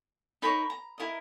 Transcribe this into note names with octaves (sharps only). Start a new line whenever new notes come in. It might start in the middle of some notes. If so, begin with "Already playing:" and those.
D#4 A#4 C#5 B5
A#5
E4 A#4 D#5